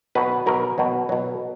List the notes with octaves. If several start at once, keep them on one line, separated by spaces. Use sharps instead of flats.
B2 F#3 B4
B2 F#3 A#4
B2 F#3
B2 F#3